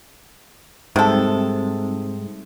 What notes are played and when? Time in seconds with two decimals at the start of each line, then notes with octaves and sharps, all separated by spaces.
0.96 G#2 C3 G3 C4 D#4 A4